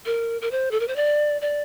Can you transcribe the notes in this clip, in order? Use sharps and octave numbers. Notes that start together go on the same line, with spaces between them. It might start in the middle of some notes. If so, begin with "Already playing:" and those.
A#4
A#4
C5
A4
A#4
C5
D5
D5